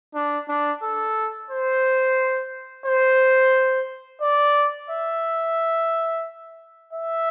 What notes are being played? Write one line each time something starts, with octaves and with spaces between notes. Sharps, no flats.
D4
D4
A4
C5
C5
D5
E5
E5